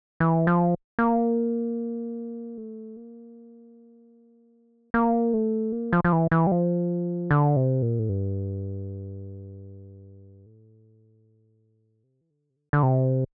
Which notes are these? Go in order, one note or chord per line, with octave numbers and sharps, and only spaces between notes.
E3
F3
A#3
A3
A#3
A#3
A3
A#3
F3
F3
E3
E3
G3
F3
D3
C3
A#2
A2
G2
A2
C3
E3
D3
C3
D3
D3
C3